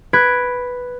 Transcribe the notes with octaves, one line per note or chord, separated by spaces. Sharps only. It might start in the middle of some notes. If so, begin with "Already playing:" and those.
B4 G#6 D7